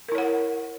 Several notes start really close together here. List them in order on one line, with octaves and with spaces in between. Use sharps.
A#4 E4 C#5 F#5